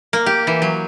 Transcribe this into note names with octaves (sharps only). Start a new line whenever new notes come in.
A#3
G4
E3
F#3